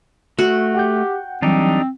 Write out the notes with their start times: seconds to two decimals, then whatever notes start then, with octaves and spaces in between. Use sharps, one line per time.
0.39 A3 F#4
0.75 G4 F#5 G5 G6
1.42 E3 F#3 G3 C4 D4 D#4 G4